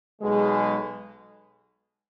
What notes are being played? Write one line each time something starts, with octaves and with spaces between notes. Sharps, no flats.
B1 B2 G#3